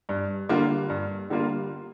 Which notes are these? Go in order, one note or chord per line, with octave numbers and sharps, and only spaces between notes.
G2
D3 G3 A#3 F4
G2
D3 G3 A#3 F4